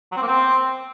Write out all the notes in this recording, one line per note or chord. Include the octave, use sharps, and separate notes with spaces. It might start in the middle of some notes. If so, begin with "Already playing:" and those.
F#3
C4
A#3
C4